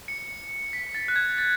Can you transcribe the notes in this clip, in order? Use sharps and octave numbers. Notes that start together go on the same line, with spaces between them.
C#7
B6
A6
F#6
G#6
A6